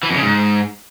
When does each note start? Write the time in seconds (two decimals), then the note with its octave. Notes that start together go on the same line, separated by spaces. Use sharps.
0.03 E3
0.09 F2
0.16 C#3
0.22 G#2